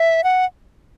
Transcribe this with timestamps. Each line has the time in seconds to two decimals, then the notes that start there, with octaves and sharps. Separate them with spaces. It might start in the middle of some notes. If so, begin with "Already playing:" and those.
Already playing: E5
0.24 F#5